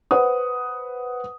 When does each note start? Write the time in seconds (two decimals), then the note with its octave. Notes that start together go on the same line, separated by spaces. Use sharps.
0.11 B4 C5 F#5 D#6